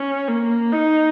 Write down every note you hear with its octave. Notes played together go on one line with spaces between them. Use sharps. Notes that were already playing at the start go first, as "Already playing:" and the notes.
Already playing: C#4
A#3
D#4